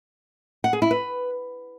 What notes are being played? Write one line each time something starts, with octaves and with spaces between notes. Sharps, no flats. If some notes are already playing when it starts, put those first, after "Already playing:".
F#5
G#4
E4
B4